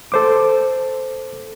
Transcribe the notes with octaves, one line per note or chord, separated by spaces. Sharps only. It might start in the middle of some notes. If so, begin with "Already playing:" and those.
A4 C5 D6